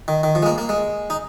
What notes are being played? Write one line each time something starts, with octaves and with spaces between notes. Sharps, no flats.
D#3
D#3
F3
G#3
A#3
A#3
G#3
D#4